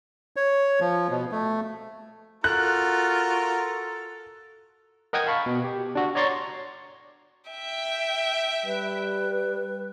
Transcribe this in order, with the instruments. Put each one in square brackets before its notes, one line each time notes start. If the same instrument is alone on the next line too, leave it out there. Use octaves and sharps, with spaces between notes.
[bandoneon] C#5
F3
B2
A3
[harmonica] F4 F#4 A#4 [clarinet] A4 [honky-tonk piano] F#6
[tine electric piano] A#4 D#5 F#5 G5 D#6 G#6
F5 A5 B5 C#6
B2
G4
D4 F#4
C#5 D5 A#5 C6 C#6 A6
[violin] E5 G5
[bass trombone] G3 [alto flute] B4